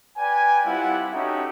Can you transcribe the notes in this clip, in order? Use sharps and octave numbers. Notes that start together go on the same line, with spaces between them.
B4 D5 G5 G#5
G3 C4 E4 F4 F#5
C#4 D#4 F#4 G4 A4 E5